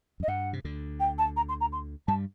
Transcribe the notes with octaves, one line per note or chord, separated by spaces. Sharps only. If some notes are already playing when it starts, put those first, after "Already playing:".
F#2
D#5
G2 F#5
C3
D2 D3
G5
A5
A#5
C6
A#5
C6
G2 G3 A5